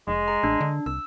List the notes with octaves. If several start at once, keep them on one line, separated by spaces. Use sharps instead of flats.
F1 G#3
G#4 A#5
A1 D4
D3
C2 E6